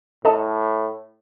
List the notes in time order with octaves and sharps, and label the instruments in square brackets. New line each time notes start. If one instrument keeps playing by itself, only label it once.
[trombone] A2 [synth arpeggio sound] A4 D#5 A5